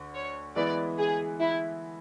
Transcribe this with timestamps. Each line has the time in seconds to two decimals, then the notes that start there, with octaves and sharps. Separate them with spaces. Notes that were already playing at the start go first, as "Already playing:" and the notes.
Already playing: D2 D3
0.14 C#5
0.56 E3 G#3 B3 E4 B4 D5
0.98 G#4
1.39 E4